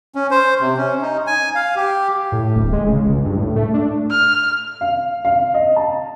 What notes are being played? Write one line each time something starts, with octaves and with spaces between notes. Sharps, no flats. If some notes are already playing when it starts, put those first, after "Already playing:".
C#4
C5
C3
C#4
D#4
G#5
F5
G4
A2
D1
G#3
C#3
C#2
G2
A2
A3
D4
F6
F5
F5
D#5
A5